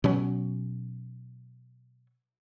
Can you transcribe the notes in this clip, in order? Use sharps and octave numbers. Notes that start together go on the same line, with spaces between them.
B2 F#3 C#4